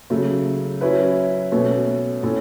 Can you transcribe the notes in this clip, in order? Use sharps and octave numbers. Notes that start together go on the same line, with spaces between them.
C#3 F#3 A3
F#3 C#4 E4 B4
B2 A3 C#4 F#4 B4
A2 A3 C#4 A4